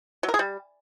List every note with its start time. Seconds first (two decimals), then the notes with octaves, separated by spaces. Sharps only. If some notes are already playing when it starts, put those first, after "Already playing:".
0.23 F#3
0.29 A#4
0.34 G#4
0.39 G3